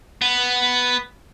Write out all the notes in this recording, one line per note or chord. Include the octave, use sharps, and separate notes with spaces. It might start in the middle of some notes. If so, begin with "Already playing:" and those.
B3